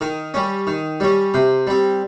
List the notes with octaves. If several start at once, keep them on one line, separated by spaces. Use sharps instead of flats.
D#3 A#4
G3 C#4
D#3
G3 C#4
C3 C5
G3 C4